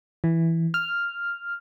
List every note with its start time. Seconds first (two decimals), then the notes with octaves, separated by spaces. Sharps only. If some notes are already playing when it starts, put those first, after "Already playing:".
0.24 E3
0.74 F6